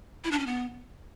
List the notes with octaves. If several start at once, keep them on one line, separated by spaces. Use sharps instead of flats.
E4
D4
C#4
B3